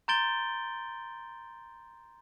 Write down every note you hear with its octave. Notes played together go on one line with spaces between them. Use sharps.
A#5 C6 G6 A6 D7 G7